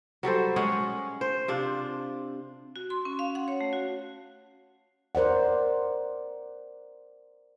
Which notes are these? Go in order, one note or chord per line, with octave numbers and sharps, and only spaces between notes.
F#3 G3 A4 C5
G#3 C#4 G#4 F#5
C5
C3 D4 F4
F#4
C6
C#4
F5
F#5
C#5
A3
F#4
A#4 C5 D5 F#5